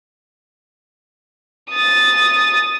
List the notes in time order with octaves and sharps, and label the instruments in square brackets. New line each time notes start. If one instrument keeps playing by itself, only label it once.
[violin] D#6 A6